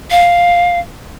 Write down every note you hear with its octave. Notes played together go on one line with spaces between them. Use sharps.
F5